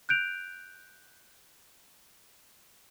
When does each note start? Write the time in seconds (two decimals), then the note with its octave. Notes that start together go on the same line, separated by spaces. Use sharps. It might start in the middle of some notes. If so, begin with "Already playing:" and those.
0.09 F#6 G6 D7 F7